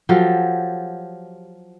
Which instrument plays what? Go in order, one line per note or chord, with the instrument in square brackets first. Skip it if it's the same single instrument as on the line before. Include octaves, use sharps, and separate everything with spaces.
[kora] F3 F#3 G4 A4